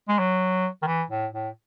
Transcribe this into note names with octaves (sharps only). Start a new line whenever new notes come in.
G#3
F#3
D#3
E3
A2
A2